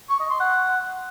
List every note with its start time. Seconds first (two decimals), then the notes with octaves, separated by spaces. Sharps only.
0.10 C#6
0.20 D#5
0.30 C6
0.40 F#5